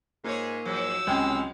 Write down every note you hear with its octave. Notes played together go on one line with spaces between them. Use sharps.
G#2 A#3 F4 G#4 C#5
G#2 F3 F#3 E6
C#2 C3 G#3 G5